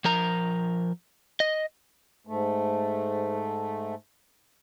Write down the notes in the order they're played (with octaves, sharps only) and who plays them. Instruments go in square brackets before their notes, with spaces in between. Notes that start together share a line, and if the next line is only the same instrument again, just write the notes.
[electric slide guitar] F3 A#4 A#5
D#5
[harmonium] G#2 A3